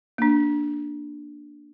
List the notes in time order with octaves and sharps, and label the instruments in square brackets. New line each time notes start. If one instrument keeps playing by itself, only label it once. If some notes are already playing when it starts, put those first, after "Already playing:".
[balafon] A#3 D4